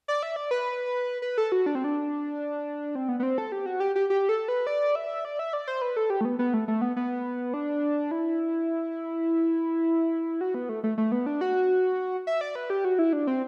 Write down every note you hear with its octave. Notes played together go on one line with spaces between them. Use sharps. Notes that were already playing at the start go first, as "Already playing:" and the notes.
D5
E5
D5
B4
B4
A4
F#4
D4
C4
D4
C4
B3
B3
C4
A4
G4
F#4
G4
G4
G4
A4
B4
D5
E5
D5
E5
D5
C5
B4
A4
G4
A3
B3
B3
A3
A3
B3
B3
D4
E4
F#4
B3
A3
A3
A3
B3
D4
F#4
E5
D5
B4
G4
F#4
E4
D4
C4